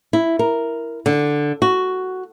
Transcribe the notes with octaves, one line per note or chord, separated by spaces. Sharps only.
E4
A#4
D3
F#4